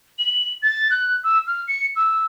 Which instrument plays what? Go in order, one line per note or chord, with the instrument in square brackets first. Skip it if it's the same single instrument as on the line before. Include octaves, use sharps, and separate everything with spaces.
[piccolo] F#7
A6
F#6
E6
F6
C#7
E6